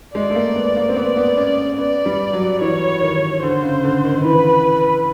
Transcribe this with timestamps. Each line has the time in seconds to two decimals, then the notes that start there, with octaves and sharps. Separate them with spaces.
0.14 G#3 D5
0.30 A3
0.35 A#3
0.55 B3
0.76 A#3
0.89 C4
0.96 B3 D5
1.17 B3
1.37 C#4
1.78 B3 D5
2.06 G3
2.33 F#3
2.61 E3 C#5
3.01 D#3
3.42 D3 C5
3.63 C#3
3.84 D3
4.04 D#3
4.15 D#3
4.24 E3 B4